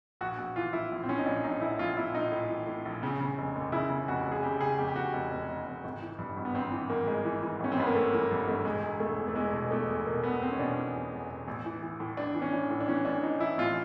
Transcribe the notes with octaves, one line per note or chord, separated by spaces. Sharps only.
A#1 F#4
A#1 F#4
E3 F4
A2 E4
A#1
C4
A2 C#4
D#4
A#1 D4
A#1 D#4
A2 E4
A#1 F4
A#1 E4
A#1 D#4
A2
E3
A2
A#1
C#3
C#3
F1
D#2
C#3 E4
C#3
F1 F#4
F1
G#4
C#3 G4
C#3 G#4
F1 G4
G4
F1 F#4
F1
F1
F1
F1
G#1
E3
G2
G#1
B3
G#1 C4
E3
G#1 A#3
G#1 G#3
E3
E3
G#1 C#4
C4
G#1 B3
A#3
G2 A3
E3 A#3
G2
G#1 A3
E1 G#3
E1
E1 A3
E2
A3
E2 G#3
B2
E2 A3
E1
B2 A#3
E1 B3
E1 C4
C#4
B2 D4
E2
E2
E1
E1
A1
E3
E3
A2
A1 D4
E3
C#4
E3 D4
A2
D4
E3 C#4
A1 D4
E3 D#4
E3 E4
A1 F4